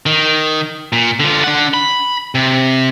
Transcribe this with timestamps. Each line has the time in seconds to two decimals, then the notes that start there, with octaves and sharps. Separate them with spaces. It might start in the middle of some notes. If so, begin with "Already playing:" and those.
0.06 D#3
0.93 A#2
1.20 D3 F4
1.44 D4 F#5
1.74 B5
2.35 C3